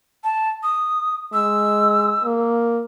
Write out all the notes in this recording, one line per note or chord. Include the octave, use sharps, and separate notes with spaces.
A5
D#6
G#3 E6
A#3